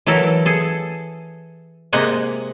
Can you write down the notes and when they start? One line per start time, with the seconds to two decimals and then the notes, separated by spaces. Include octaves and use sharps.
0.07 E3 F#3 E4 A4 A#4
0.46 G#4 A4
1.93 C3 G#3 A#3 F#5 G#5